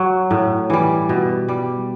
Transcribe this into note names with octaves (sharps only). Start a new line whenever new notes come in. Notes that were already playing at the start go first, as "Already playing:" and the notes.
Already playing: F#3
A2
E3 G3
B2
G3